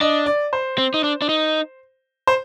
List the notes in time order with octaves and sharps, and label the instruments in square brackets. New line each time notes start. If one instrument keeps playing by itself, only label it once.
[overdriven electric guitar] D4 [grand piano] D#5
[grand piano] D5
C5
[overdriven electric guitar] C4
D#4
D4
D4
D#4
[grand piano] C5